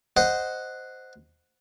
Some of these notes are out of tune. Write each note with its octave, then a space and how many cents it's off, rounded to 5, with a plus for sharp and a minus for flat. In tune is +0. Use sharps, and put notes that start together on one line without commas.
C5 -10 D#5 +0 F#5 +0